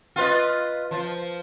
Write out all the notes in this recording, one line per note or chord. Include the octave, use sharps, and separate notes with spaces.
F4 B4 D#5
F3